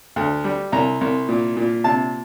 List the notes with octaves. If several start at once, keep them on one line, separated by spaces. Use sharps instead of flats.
D2
G3
C2 A#5
C2
A#2
A#2
C3 A5